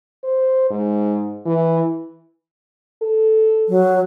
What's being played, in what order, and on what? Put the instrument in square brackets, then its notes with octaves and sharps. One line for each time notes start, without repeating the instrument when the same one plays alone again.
[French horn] C5
G#2
E3
A4
[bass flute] F#3